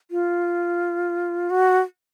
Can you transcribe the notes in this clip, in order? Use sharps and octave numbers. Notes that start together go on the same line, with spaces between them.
F4
F#4